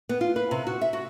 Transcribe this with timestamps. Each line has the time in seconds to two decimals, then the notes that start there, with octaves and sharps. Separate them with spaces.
0.09 B3
0.21 F4
0.36 B4
0.51 C3
0.67 F#4
0.81 E5
0.93 F#4